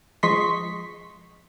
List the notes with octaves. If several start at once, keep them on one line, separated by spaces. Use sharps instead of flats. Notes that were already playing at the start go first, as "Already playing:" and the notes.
F3 G#3 D#5 C6 C#6 B6